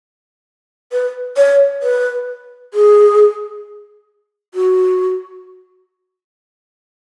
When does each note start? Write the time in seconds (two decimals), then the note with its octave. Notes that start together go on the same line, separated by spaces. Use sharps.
0.92 B4
1.37 C#5
1.83 B4
2.74 G#4
4.54 F#4